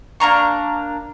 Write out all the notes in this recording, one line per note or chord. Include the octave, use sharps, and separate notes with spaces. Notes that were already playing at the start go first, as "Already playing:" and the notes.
A#3 D4 A#5 C#6